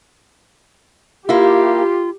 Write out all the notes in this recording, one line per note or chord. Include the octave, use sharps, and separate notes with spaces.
A#3 E4 F4 G4